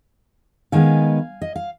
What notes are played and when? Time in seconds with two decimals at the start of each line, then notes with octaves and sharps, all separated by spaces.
0.72 D#3 G#3 B3 F5 G#5
1.42 D#5
1.56 F5